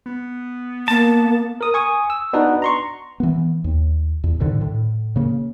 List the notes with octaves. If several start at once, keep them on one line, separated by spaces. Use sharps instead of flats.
B3
A#3 A5
A#4 D#6
G#5 C#6 D#6
E6
B3 D4 D#4 F#4 B4
A#5 C6 C#6
E3 B3
D#2
E2
C2 A2 D3 D#3
A2
C#3 A#3